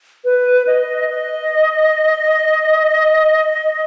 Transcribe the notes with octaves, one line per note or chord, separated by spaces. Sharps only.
B4
D#5
D#5